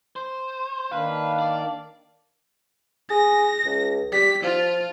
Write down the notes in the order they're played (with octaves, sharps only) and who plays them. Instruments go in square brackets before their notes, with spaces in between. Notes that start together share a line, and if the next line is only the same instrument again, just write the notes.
[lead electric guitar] C5
[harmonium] D#3 A#3 D4 [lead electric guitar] B4 [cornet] F5
[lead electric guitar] D5
[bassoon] G#4 [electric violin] A#6
[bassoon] C#2
[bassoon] G3 [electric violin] B6
[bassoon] F3 [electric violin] F4